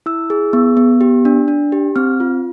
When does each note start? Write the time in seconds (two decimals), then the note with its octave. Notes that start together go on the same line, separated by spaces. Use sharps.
0.06 E4 E6
0.30 G#4
0.53 B3
0.77 B3
1.01 G4
1.25 D4
1.48 D4
1.72 G4
1.96 C4 F6
2.20 F4